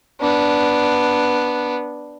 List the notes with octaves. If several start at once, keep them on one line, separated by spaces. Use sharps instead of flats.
B3 D4